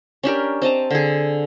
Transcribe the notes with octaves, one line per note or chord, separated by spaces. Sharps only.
C#4 D4 G4 A#4
C4 D#5 A5 A#5
D3 G#4